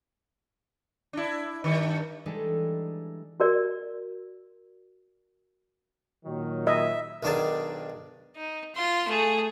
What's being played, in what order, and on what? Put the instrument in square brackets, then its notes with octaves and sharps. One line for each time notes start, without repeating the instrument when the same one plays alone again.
[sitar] D4 E4
G2 D#3
[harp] E3 G3 G#3 D4 D#4 A4
[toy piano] F#4 A#4 D5
[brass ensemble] A#2 D#3 F#3
[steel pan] D#5 [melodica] E5
[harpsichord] B1 D#3 D4 G#4 A5
[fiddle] D#4
F4 C6
A3 G#4